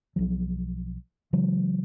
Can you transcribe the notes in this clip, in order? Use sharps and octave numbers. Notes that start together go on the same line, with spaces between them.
B1 F3 F#3
C#3 E3 F#3 G#3